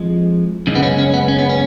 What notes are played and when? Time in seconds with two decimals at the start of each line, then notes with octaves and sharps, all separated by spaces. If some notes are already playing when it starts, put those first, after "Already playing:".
Already playing: F2 F3 G#3
0.67 F#2 C#3 G#3
0.75 B3
0.83 C#4
0.98 C#4
1.14 B3
1.28 C#4
1.39 B3
1.49 C#4